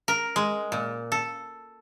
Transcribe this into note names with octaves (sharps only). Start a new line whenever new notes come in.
A#4
G#3
A#2
A4